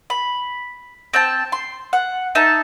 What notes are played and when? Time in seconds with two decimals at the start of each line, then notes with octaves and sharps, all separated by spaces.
0.10 B5
1.13 C4 G5 A5
1.52 C6
1.93 F#5
2.35 D#4 E5 A5